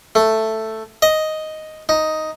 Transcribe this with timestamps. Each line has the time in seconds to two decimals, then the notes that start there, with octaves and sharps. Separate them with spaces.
0.15 A3
1.02 D#5
1.89 D#4